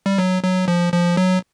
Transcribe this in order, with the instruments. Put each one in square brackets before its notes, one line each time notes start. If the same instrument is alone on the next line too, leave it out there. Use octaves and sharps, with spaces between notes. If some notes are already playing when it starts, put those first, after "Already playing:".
[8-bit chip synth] G3
F#3
F#3
F3
F3
F#3